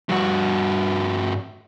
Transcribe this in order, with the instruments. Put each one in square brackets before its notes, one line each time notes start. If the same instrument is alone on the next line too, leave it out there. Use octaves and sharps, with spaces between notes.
[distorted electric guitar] G2 F#4